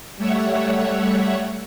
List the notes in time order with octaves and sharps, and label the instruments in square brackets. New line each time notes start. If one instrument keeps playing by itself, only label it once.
[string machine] G3 A3 C#5 E5 F#5